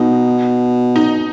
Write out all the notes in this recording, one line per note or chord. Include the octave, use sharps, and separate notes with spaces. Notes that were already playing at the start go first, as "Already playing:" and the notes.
Already playing: B2 D#4
D#4